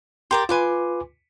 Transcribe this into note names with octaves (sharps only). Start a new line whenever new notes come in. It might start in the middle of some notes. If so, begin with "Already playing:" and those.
G4 A#4 D5 C6
F4 B4 G#5 C6 D6